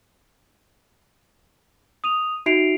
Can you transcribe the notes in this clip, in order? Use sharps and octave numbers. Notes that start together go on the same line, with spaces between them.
D#6 D#7 F7
D#4 F#4 E5 C7 D7 F7